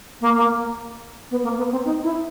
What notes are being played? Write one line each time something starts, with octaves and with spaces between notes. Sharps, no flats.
A#3
A#3
B3
A#3
B3
C4
D#4
E4